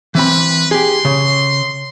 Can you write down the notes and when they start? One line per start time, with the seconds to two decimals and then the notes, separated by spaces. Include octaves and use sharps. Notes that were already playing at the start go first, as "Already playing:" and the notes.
0.15 E3 C4 B4 B5
0.71 G4 G#4 C6
1.05 C#3